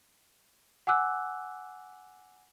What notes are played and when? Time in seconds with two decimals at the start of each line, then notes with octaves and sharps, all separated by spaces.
0.87 F#5 G#5 D6 E6 F#6